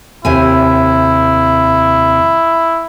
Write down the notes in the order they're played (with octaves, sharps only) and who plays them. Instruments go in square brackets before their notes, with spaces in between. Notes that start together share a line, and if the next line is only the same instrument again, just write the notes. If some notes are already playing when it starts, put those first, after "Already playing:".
[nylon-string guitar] D#2 C3 G#5 [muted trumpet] E4